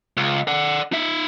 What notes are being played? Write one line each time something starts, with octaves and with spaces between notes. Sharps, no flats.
C#2
D5 F#5
D#4 E5